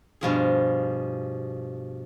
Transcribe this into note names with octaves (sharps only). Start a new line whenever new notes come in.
G2 B2 F3 G#4